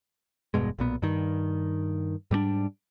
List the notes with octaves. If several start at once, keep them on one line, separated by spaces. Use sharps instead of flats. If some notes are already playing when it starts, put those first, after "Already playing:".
E1 G2 B2 G#3
B1 A#2 B3
G2 D#3
G#2 G3 A3 D4